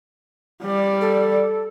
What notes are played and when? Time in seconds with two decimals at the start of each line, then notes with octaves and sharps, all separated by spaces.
0.62 G3 D5
1.01 A4